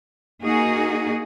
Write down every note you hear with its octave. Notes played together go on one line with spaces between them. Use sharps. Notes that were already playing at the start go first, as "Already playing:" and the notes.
A#3 D#4 F#4 G#4